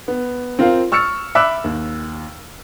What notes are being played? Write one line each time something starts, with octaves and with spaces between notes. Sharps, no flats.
B3
C4 F4 A#4 F5
C#6 E6 F6 A6 C#7
E5 B5 D6 E6 F#6
D#2